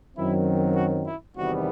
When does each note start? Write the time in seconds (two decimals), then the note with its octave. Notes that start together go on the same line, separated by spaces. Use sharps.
0.16 F#2 D#3 F#3 C4 E4
0.76 F#4
1.06 E4
1.36 E2 C3 D#3 G3 B3 F#4